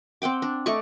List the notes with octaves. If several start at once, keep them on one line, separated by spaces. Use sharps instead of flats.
C4 F#5 G5 D6
D4
A3 D5 D#5 C#6